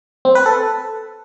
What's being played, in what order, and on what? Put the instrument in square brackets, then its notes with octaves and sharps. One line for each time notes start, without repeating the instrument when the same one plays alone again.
[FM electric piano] C4
B4
A4